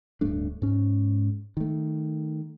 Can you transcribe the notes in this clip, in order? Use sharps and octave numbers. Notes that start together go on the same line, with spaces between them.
D1 G2 A3 D4
G#2 C#4
D#3 A3